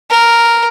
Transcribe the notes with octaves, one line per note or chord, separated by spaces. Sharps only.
A#4